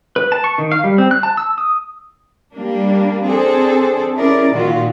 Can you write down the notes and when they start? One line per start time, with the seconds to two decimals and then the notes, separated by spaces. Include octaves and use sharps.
0.16 B4
0.32 A5
0.44 C#6
0.58 D#3
0.72 F5
0.84 G3
0.98 C4
1.11 F#6
1.23 A5
1.37 E6
1.58 D#6
2.56 G3 A#3 D4
3.25 C4 D4 G#4 A4 C5
4.17 C#4 E4 G#4 A#4 D5
4.51 A#2 D#3 F4 F#4